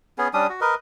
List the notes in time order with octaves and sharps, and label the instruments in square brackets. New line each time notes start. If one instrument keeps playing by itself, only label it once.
[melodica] B3 C#4 G#4
G3 C#4 D4 D#6
F#4
A#4 B4 D#5